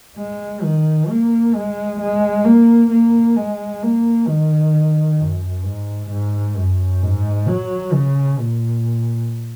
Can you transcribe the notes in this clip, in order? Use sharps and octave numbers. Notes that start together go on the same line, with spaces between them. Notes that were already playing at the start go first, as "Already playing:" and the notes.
G#3
D#3
A#3
G#3
G#3
A#3
A#3
G#3
A#3
D#3
F#2
G#2
G#2
F#2
G#2
F#3
C#3
A#2